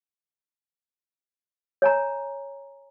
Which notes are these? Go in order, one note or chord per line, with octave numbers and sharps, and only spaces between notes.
C#5 G#5 A#5